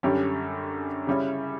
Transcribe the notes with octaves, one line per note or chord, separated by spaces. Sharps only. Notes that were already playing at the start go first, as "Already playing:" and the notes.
F#2 D3 G3 C#4 G4
C#3 G3 C#4 E4